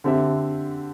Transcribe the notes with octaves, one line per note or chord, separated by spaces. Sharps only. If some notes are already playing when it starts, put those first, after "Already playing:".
D3 C4 G4 E5